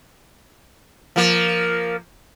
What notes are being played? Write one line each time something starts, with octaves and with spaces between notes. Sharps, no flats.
F3 A#3